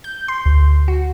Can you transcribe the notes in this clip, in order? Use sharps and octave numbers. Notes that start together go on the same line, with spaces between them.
G6
C6
D2
F#4